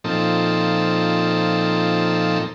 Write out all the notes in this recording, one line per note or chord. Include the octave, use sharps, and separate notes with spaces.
A#2 F3 C4 D#4 A4